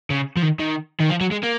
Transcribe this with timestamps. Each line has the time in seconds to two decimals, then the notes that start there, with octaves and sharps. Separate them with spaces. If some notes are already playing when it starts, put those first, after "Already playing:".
0.10 C#3
0.37 F3
0.43 D#3
0.60 D#3
1.00 D#3
1.10 F3
1.21 F#3
1.31 G#3
1.43 A#3